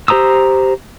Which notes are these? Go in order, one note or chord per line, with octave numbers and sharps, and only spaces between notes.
G4 C5 A#5 D#6 E6